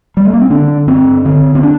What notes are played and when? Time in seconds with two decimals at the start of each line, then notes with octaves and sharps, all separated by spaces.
0.17 G3
0.25 A3
0.33 A#3
0.41 C4
0.50 D3 D4
0.87 G2 C4
1.25 D3 C4
1.55 C4
1.63 D4